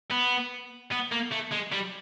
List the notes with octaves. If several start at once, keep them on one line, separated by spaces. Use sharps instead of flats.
B3
B3
A#3
A3
G#3
G3